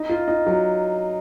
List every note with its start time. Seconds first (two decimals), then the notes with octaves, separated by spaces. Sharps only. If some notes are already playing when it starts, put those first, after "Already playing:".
Already playing: D#4
0.09 F4
0.28 D#4
0.46 F#3